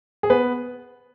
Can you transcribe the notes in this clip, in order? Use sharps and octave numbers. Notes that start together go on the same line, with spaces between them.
G#4
B3 B4